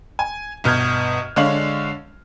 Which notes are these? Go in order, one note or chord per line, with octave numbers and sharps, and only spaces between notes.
G#5
G1 B2 F6 G6 G#6
D3 G#3 D4 C#5 F5 F#7